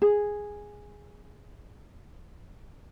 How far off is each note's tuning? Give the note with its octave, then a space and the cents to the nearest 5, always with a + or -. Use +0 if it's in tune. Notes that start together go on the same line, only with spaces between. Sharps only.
G#4 -5